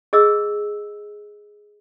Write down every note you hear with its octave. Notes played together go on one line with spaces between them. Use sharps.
G#4 D#5 E6